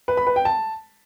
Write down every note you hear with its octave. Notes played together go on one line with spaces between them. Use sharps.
B4
B5
B4
G5
A5